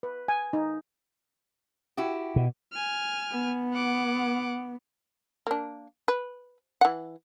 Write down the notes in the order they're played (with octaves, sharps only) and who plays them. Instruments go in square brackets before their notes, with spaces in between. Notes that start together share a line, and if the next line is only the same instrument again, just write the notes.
[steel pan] B4
G#5
D#4
[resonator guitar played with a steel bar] E4 F#4 G4
[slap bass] B2
[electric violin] G#5 F6
[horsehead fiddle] B3
[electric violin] F#5 D6
[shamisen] A#3 D4
B4
E3 F#5